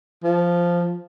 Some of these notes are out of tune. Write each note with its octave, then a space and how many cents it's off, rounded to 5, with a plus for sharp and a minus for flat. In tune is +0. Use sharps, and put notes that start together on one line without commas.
F3 -5